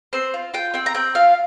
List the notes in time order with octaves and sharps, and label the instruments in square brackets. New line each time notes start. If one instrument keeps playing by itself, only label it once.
[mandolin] C4 C5
F4
F4 G5
C4 G5
A#5
C4 G5
F4 F5